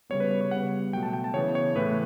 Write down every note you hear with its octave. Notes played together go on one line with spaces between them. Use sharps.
C#3 G3 B3 C#5
B4
B4
C#5
C#3 G3 B3 F#5
B2 F#3 A3 G5
A5
G5
A5
C#3 E3 B3 C#5
C#5
A2 E3 A3 B4